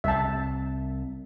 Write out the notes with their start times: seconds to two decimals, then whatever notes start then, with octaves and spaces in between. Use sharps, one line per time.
0.04 C2 E5 A5